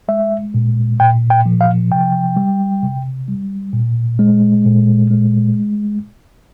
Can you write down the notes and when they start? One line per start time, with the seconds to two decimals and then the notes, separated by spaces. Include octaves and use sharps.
0.08 G#3 E5
0.54 A#2
1.00 A#2 G5
1.30 G5
1.46 F3
1.61 F5
1.91 C3 G5
2.36 G3
2.83 C3
3.28 G3
3.73 A#2
4.19 G#3
4.65 A#2
5.10 G#3